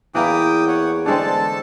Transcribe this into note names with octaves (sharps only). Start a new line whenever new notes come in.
E2 E3 A#3 E4 G5 D6 D#6
C#5 F#5
D3 G#3 C4 A4 A5